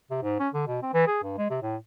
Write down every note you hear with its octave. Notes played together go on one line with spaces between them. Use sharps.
C3
G#2
C#4
D3
B2
C4
E3
G#4
G2
G#3
C3
A2